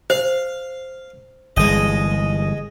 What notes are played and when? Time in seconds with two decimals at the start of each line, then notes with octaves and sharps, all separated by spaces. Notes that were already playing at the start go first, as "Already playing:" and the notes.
0.10 C5 F5
1.57 G1 E3 G#3 D#5